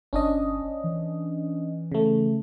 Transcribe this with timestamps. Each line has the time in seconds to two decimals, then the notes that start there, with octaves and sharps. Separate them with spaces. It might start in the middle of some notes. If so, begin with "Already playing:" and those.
0.13 G1 C#4 D4 D#5
0.84 E3
1.92 C#3 A3